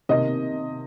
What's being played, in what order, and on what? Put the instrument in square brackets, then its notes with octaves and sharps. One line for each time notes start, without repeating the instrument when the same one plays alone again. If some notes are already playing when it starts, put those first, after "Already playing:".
[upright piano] C3 D#3 A#3 D#5